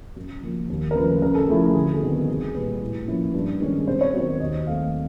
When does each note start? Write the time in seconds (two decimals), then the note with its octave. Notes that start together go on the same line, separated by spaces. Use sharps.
0.16 F#2
0.43 C#3 F3 A#3
0.70 D#2
0.91 A#4
0.95 C#3 F3 A3 B4
1.22 C#3 A#4
1.35 A4
1.49 F3 A3 C#4 E4 G#4
1.62 A4
1.75 D2 G#4
1.93 A4
2.02 C3 D#3 G3 B3
2.11 G#4
2.28 C2 G#4
2.54 A#2 G3 B4
2.82 A2
3.08 F3 A#3 C#4 E4
3.34 G2
3.60 D#3 G#3 C#4
3.87 C3 C5
4.01 C#5
4.14 D#3 F#3 B3 C5
4.40 D#2 D#5
4.67 D#3 F#3 A3 C4 F5